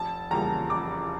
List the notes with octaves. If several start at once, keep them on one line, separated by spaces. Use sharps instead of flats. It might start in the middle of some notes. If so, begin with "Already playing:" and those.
Already playing: F1 A5
E2 C#3 G3 A#3 A#5
F1 D6